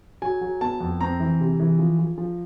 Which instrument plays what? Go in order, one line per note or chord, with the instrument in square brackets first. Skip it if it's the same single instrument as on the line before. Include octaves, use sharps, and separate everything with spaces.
[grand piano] F#3 G#5
F#3
B3 A5
F2
C4 A#5
E3
C3
E3
F3
F3
F3